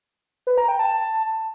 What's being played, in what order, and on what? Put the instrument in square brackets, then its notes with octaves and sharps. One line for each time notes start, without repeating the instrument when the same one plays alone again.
[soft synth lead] B4
A#5
G5
A5